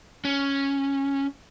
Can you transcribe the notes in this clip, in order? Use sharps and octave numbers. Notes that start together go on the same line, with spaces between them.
C#4